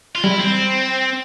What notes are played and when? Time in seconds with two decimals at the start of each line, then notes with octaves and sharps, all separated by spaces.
0.15 F4
0.24 G3 E4
0.39 C4